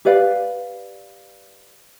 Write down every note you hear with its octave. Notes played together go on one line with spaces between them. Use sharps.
G4 B4 D5 F5